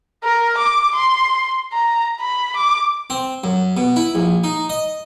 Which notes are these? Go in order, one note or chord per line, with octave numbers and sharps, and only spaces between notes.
A#4
D6
C6
A#5
B5
D6
C4
F#2
B2
E4
A#1
D#4
D#5